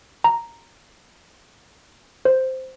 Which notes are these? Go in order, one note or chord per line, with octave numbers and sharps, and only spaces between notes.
A#5
C5